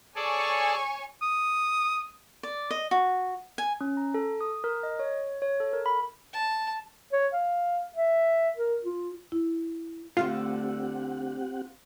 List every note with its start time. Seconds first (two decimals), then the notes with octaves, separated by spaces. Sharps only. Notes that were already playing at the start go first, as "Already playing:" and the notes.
0.15 G#4 A4 C#5 D5 G#5 C#6
1.22 D#6
2.43 D5
2.71 D#5
2.91 F#4
3.58 G#5
3.81 C#4
3.97 A#5
4.14 A4
4.41 D#6
4.64 A#4
4.83 D#5
4.99 C#5
5.42 C#5
5.60 A4
5.73 A#4
5.86 B5
6.33 A5
7.13 C#5
7.34 F5
7.96 E5
8.57 A#4
8.84 F4
9.32 E4
10.17 D2 D3 A3 C4 F4 G4 F#5